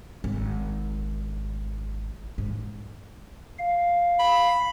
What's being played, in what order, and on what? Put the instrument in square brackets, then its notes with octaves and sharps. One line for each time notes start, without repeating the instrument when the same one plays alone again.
[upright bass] G#1
G#2
[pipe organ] F5
[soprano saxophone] B5